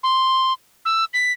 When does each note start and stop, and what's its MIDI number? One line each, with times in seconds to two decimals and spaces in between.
0.03 0.53 84
0.85 1.05 88
1.14 1.32 95